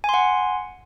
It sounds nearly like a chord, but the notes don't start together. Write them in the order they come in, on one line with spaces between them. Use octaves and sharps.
G#5 C6 F#5